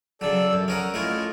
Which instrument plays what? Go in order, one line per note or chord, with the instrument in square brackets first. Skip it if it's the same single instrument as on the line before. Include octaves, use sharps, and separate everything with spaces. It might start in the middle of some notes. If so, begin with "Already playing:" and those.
[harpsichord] C#3 F#3 [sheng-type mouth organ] A4 D5 E6
[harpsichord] F#2
[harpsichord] C#4 A#4 F#5 [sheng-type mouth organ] D#6 F6
[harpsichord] A3 C#4 E4 [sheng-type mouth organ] F4 D#5 F6